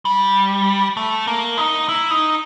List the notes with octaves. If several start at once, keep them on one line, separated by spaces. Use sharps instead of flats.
G3
A3
A#3
D#4
E4
D#4